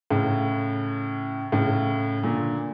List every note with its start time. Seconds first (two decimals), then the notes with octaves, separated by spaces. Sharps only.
0.11 A2 C#3
1.52 A2 C#3
2.23 A#2 D3